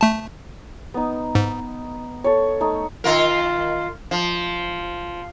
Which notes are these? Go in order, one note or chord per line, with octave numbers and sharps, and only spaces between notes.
A3 A5
B3 D#4
G#2
A4 C#5
A3 D#4
D#3 F4 A#4
F3